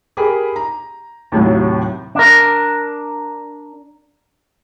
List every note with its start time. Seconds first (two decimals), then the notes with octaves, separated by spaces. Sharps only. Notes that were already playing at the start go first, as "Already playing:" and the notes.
0.17 G4 G#4 A#4 B5
0.56 A#5
1.32 D#2 A2 C3 F#3
2.15 D4 A#4